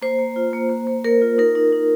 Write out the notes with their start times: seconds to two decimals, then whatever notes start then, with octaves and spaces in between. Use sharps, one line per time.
0.02 A#3 C5
0.19 A#3
0.36 F4
0.53 A#3
0.70 A#3
0.87 A#3
1.04 A#3 A#4
1.22 F4
1.38 D#4 A#4
1.55 D#4
1.72 D#4